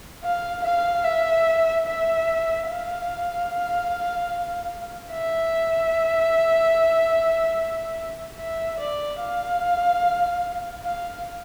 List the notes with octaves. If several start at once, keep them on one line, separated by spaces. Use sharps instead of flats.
F5
F5
E5
E5
F5
E5
E5
D5
F5
F5